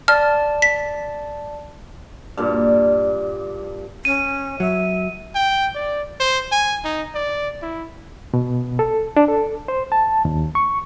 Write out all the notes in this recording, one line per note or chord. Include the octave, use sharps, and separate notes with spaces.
D5 A5 F6
B6
G2 A#2
C#4 D#7
F#3 E5
G5
D5
C5
G#5
D#4
D5
E4
B2
A4
D4
A4
C5
A5
D#2
C#6